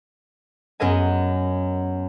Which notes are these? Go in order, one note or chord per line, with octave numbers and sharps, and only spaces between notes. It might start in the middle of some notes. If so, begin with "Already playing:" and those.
F#2 B3 A#4 D#5 G#5